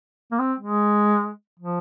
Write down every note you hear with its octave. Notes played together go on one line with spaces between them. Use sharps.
A#3
C4
G#3
F3